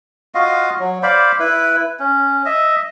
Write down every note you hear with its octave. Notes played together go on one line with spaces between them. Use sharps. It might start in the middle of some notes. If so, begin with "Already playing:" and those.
F4 F#4 D#5 F5
F#3
C5 D5 F5 B5
E4 B4
C#4
D#5 E5